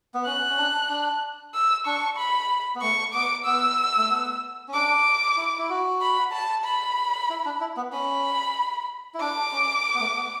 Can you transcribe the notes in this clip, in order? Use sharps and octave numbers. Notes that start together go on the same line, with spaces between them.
B3
C#4 F#6
C#4
D4
D4
E6
D4 C#6
B5
B3
A3 C#6
B3 D6
B3 E6
A3
B3
C#4
D4 D6
E4
E4
F#4
B5
A5
B5
E4
D4
E4
B3
C#4 B5
E4
D4 D6
C#4
B3
A3
B3